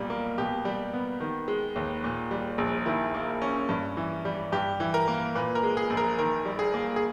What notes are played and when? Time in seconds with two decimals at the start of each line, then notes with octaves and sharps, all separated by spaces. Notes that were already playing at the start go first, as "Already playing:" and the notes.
Already playing: B1 A#2 G3
0.10 A#3
0.38 B2 G4
0.65 G3
0.93 B3
1.20 D#3
1.48 G#3
1.76 D#2
2.04 A#2
2.31 G3
2.58 A#1
2.86 D#3 E4
3.14 A#3
3.42 C#4
3.69 G2
3.97 E3
4.25 G3
4.52 G2 G4
4.80 E3
4.94 A#4
5.08 A#3
5.35 A#2 B4
5.55 A#4
5.63 G#3
5.77 G#4
5.90 A#1
5.97 A#4
6.18 D#3 A#4
6.46 G3
6.59 G#4
6.74 A#3
6.96 G#4